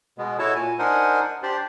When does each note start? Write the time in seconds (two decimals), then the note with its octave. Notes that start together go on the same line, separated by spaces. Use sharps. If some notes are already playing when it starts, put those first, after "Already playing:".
0.18 B2 G#3 B3
0.39 E4 F#4 A4 C#5 A5
0.55 A#2 G#5
0.79 D4 D#4 A#4 C5 F#5 G#5
1.43 D4 G4 C5 D5